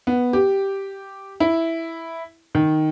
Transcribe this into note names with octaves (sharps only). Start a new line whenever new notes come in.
B3
G4
E4
D#3